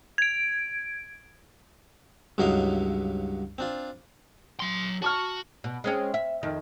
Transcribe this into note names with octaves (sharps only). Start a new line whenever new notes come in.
G#6 D7
C#2 G2 F#3 E4 D#5 F5
C4 D4 F4
F#3 C6
F#4 A5 C#6 F6
B2
G#3 C4 C#4
E5
F2 D#3